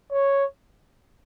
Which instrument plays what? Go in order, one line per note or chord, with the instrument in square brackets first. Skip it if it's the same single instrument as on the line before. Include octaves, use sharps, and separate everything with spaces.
[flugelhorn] C#5